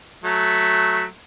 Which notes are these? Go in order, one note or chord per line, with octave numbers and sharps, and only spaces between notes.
F#3 A3